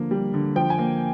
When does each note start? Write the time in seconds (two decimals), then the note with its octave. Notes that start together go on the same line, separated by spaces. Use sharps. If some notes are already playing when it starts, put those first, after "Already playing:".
Already playing: D3 F3 A#3
0.11 G3
0.34 D3
0.56 F3 G5
0.70 G#5
0.78 A#3